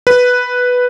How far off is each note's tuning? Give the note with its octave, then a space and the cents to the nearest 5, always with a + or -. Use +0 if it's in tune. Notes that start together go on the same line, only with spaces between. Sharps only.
B4 +0